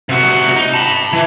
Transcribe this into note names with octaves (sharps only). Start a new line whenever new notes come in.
C3 F#4
D#4
A5 B5
E3